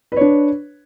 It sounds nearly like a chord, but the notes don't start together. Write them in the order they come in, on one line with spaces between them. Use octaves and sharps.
B4 C#5 D4